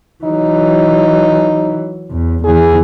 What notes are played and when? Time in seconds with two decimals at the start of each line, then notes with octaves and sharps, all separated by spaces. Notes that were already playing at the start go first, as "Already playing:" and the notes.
0.24 E3 F#3 D#4
2.11 E2
2.44 E2 E3 G#4